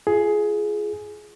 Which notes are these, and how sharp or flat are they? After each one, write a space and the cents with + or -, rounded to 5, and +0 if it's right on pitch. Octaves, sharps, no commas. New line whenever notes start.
F4 -20 G#4 +15